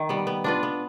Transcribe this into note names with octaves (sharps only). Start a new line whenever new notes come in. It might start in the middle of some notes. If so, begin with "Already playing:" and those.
Already playing: D#3
G3 B3
B3
D4 F4 B4
B3